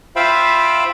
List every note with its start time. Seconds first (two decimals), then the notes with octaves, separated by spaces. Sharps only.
0.16 F4 C5 E5 F5 G5 B5